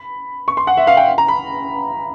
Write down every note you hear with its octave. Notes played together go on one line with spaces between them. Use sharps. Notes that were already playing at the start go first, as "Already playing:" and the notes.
Already playing: B5
C#6
C6
F#5
E5
F5
G5
A#5
B5